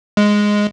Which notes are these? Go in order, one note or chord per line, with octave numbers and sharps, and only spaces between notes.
G#3